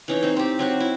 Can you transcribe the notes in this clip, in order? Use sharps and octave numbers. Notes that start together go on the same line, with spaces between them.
E3 C#4 D#4
C4 D#4
C4 G4
F#3 C4 F#4
E4